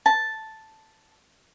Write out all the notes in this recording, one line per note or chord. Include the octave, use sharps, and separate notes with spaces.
A5